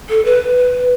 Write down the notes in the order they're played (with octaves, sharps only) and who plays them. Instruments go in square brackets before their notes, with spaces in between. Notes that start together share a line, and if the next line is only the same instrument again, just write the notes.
[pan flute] A4
B4